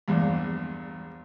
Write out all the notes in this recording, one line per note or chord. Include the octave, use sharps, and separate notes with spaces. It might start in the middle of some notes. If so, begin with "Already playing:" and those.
A#1 E2 G2